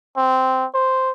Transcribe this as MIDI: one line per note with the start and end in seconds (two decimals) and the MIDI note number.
0.17 0.65 60
0.74 1.11 72